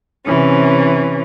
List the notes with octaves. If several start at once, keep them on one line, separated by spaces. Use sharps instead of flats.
C3 E3 C#4